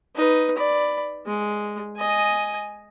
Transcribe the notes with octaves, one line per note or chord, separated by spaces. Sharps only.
D#4 B4
D5 B5
G#3
D#5 G#5